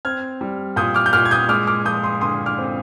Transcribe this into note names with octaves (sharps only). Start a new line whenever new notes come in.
C4 F6 G#6
G3
A#2 D#6 G6
D6 F6
G6
A#2 D6 F6
G#6
D#6 G6
G#3 D6 F6
D6 F6
F3 D#6 G6
C6 D#6
D3 C6 D#6
D6 F6
C4